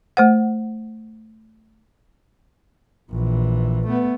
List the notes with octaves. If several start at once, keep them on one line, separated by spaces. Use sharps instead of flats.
A3 C5 F#5
A#1 E3
A3 B3